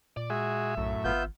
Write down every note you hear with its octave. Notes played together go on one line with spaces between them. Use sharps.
A#2 D5
G#3 F#4 G#4 E5
B1 F#2 A2
G#1 B3 F4 G6